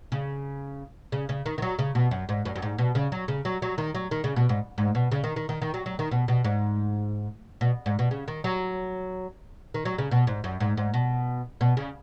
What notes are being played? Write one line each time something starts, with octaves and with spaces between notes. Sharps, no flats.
C#3
C#3
C#3
D#3
D#3
F#3
C#3
B2
F#2
G#2
F#2
F#2
G#2
B2
C#3
F#3
C#3
F#3
F#3
D#3
F#3
D#3
C#3
B2
G#2
G#2
B2
C#3
D#3
D#3
D#3
D#3
F#3
F#3
D#3
B2
B2
G#2
B2
G#2
B2
C#3
D#3
F#3
D#3
F#3
C#3
B2
G#2
F#2
G#2
G#2
B2
B2
C#3